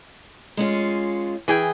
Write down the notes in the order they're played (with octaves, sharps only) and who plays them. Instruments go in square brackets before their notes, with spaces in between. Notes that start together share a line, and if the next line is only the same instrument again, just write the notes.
[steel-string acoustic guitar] G#3 C#4 F4
[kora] E3 G#4 G5